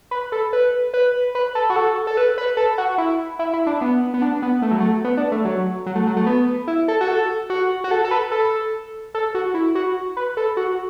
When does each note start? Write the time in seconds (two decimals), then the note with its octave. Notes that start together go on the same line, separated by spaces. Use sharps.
0.11 B4
0.32 A4
0.53 B4
0.94 B4
1.35 B4
1.55 A4
1.70 F#4
1.76 A4
2.07 A4
2.17 B4
2.38 B4
2.57 A4
2.78 F#4
2.98 E4
3.39 E4
3.53 E4
3.67 D4
3.81 B3
4.14 B3
4.22 D4
4.42 B3
4.62 A3
4.71 F#3
4.80 A3
5.04 B3
5.17 D4
5.32 A3
5.45 F#3
5.86 F#3
5.95 A3
6.07 F#3
6.16 A3
6.26 B3
6.68 E4
6.88 A4
7.01 F#4
7.08 A4
7.50 F#4
7.84 F#4
7.91 A4
8.05 A4
8.11 B4
8.31 A4
9.15 A4
9.35 F#4
9.54 E4
9.75 F#4
10.17 B4
10.37 A4
10.57 F#4